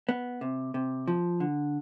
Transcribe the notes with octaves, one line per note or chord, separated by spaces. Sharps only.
B3
C3
C3
F3
D3